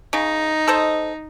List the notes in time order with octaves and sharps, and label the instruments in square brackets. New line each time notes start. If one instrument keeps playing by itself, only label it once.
[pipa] C#3 [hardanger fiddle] D#4
[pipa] A4 C5 D#5